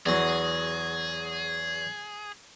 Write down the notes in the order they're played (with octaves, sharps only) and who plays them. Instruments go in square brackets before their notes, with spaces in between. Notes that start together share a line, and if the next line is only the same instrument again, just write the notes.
[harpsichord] E2 F#3 [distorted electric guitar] G#4